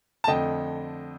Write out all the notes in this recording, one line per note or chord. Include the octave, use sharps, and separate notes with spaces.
A5
F2 D3 A3 D#5 G5